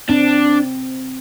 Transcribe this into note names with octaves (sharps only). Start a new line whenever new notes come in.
C4 D4